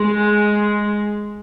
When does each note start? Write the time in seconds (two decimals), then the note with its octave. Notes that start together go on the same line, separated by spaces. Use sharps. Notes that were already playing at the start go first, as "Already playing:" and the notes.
Already playing: G#3